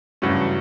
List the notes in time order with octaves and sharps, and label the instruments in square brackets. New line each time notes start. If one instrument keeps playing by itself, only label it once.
[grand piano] G2 F#3 A3 C#4 F#4 [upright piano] C#3 E3